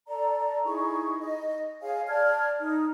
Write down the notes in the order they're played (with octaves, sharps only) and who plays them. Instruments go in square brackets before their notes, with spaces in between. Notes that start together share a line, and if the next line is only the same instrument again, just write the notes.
[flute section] A4 D5 A#5
D#4 E4 G#4 C#6
D#5
G#4 C#5 F5 G#5
D5 A5 F6 G#6
D#4